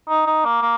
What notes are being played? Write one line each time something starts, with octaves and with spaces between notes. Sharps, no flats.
D#4
D#4
A#3
A#3